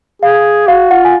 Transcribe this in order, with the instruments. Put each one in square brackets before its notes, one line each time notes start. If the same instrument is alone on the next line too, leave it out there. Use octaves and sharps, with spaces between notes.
[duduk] G#4 [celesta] F5
[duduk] F#4 [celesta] F5
[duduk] F4 [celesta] F#5
[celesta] G#5